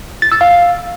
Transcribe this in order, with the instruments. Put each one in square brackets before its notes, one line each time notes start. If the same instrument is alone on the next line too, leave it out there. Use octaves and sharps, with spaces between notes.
[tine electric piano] A6
E6
F5